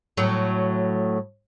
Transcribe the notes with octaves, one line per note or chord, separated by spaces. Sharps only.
A2 F#3